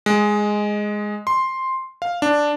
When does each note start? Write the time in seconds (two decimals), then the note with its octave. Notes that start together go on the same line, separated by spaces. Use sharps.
0.06 G#3
1.27 C6
2.02 F5
2.22 D4